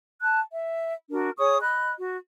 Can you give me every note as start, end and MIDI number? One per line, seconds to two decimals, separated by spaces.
0.21 0.40 81
0.21 0.40 90
0.51 0.94 76
1.11 1.30 62
1.11 1.30 66
1.11 1.30 70
1.38 1.59 68
1.38 1.59 73
1.38 1.59 85
1.38 1.59 87
1.61 1.92 75
1.61 1.92 83
1.61 1.92 90
1.97 2.16 66